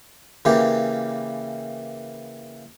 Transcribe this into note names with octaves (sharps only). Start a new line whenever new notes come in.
C#3 E3 A#3 G4